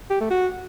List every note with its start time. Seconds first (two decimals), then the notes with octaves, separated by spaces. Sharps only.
0.10 G4
0.20 A3
0.31 F#4